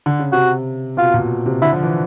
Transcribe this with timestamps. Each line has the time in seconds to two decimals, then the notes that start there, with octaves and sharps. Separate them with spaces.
0.06 D3
0.19 C#3
0.32 C3 F#4
0.97 B2 F4
1.14 A#2
1.46 C3
1.62 D3 E4
1.73 F3
1.83 E3